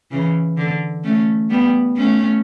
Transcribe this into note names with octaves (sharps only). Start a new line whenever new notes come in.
C#3 E3
D3
A3 C#4
G3 B3
A3 C#4